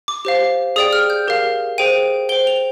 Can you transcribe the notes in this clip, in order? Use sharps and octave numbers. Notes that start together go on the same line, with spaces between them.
D6
G4 C5 F5
G#4 D5 G5 D#6
F6
G6
G4 A#4 F5
G#4 C5 G5 D#7
C5 G5 G7
F7